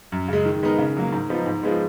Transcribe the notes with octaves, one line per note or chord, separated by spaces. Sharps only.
F#2
C#3 G#3
D#3
G#3 B3 D#4 A#4
C#3
F#3 A#3
G#2
F3 B3 D#4
G#2
F3 G#3 B3